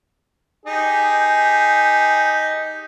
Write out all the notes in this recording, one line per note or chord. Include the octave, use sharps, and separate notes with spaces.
D#4 G4 G#4